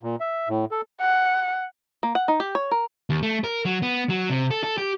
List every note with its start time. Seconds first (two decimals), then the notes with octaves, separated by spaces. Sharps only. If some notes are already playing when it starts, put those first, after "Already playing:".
0.03 A#2
0.20 E5
0.49 A2
0.71 A4
1.01 F#5
2.03 A#3
2.15 F#5
2.28 D#4
2.40 G4
2.55 C#5
2.71 A#4
3.10 D#2
3.23 A3
3.44 A#4
3.65 F#3
3.82 B3
4.09 F#3
4.30 C3
4.51 A4
4.63 A4
4.78 G4